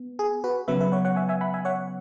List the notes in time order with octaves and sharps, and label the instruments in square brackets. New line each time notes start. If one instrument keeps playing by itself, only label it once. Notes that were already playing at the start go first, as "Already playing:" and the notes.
Already playing: [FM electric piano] B3
G#4
F#4 B4
C#3 F#3 B3 B4 E5
B4 E5
C#5 F#5
C#5 F#5
E5 G#5
E5 G#5
F#5 B5
E5 G#5
C#5 F#5